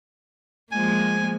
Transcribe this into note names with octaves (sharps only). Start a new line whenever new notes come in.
F3 G#3 A#3 G#5